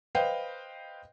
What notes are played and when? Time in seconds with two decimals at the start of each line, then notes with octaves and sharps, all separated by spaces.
0.15 B4 C5 D#5 F5 G5